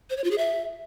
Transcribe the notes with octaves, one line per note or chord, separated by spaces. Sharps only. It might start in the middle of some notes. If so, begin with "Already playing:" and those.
C5
C#5
F4
G#4
E5